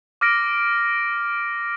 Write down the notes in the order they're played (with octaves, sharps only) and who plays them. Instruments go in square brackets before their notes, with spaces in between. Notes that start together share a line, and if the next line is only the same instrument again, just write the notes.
[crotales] D6 F6 A#6 D7